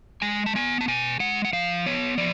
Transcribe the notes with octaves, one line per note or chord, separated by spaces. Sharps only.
G#3 G#5
A5
B3 G#5
A5
B2 G#5
G#3 F#5
F#5
F3 F5
B3 C#5
F3 D5